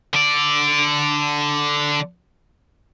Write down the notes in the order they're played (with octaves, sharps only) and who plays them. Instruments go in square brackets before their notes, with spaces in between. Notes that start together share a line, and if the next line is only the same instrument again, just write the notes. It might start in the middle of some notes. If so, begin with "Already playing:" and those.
[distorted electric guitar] D3 D5